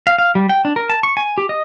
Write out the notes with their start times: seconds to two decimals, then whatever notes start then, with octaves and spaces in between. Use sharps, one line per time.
0.07 F5
0.18 F5
0.35 G3
0.49 G5
0.65 D4
0.76 A#4
0.90 A5
1.03 C#6
1.17 G#5
1.38 G4
1.49 D#5